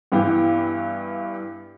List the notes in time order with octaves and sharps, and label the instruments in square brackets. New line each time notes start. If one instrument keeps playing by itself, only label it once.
[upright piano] G2 E3 B3 E4 G4